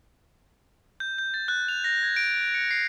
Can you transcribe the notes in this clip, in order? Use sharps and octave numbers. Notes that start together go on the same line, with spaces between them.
G6
G6
A6
F#6
F7
A#6
G#6
D7
C#7
C7